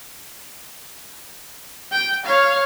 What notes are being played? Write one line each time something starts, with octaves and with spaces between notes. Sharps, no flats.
G5
C#5 F5